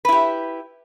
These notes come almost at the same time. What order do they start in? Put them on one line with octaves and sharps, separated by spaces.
B4 E4 G4